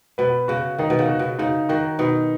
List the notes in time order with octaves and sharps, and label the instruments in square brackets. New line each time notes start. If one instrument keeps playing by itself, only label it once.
[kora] B2 [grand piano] B4
[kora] C#3 [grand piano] F#4
[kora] D#3 [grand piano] D#4
[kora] B2
C#3
[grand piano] F#4
[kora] B2
[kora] C#3 [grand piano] D#4
[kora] D#3 [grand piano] F#4
[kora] B2 [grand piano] D#4